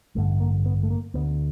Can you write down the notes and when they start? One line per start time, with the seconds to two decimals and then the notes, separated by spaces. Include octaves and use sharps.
0.15 A1 G2 D3 A3
0.40 A#3
0.66 B3
0.83 A3
0.90 A#3
1.14 D2 B3
1.17 D3